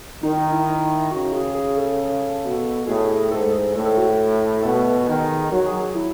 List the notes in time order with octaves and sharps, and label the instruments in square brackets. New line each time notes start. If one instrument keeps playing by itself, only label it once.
[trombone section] D#3 [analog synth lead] D#4
[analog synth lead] D#4
E4
[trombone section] C#3 [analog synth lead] F#4
[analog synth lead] G#4
G#4
A4
[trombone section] B2
[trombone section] A2 [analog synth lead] G#4
[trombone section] G#2 [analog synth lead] A4
[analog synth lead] G#4
[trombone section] A2 [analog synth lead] A4
[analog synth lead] A4
F#4
[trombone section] B2 [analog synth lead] A4
[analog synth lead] F#4
[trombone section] D#3 [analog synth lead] G#4
[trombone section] F#3 [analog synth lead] F#4
[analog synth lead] G#4
G#4
E4